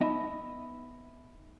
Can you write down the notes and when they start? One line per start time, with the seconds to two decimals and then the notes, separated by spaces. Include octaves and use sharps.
0.01 B3 D#4 D#5 E5 B5